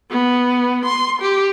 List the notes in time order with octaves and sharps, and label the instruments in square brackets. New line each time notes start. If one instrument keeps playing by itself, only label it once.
[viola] B3
C6
G4